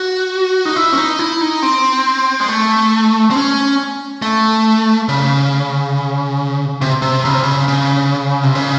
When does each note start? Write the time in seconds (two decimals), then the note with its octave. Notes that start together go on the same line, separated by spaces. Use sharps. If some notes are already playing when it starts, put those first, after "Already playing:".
Already playing: F#4
0.65 D#4
0.76 E4
0.92 C#4
0.97 D#4
1.19 E4
1.41 D#4
1.63 C4
2.40 G#3
2.48 A3
3.31 C4
3.35 C#4
4.22 A3
5.09 C#3
6.81 C3
7.02 C3
7.25 C#3
7.34 C3
7.44 C#3
7.68 C#3
8.43 C3
8.55 C#3